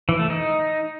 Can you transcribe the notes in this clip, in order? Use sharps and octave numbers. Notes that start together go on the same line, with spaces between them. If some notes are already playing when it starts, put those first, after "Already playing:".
E3
A3
D#4